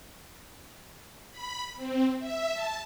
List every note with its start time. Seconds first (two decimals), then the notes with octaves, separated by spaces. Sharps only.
1.31 B5
1.76 C4
2.19 E5
2.53 A5